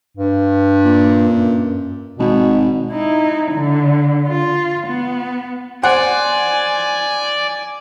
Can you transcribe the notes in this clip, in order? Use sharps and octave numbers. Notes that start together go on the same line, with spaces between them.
G2
A#2
F#2
G#1 B2
D#4 E4
D3
F4
B3
C5 D5 F#5 G#5